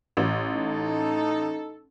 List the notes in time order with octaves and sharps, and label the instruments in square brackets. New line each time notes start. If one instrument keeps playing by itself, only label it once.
[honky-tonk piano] A1
[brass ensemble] D#4 A4